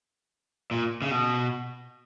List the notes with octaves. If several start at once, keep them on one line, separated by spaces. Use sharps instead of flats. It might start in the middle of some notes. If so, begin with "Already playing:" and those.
A#2
C#3
B2